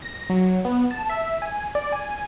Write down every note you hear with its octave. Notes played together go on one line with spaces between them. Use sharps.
A#6
F#3
B3
A5
E5
G#5
D5
G#5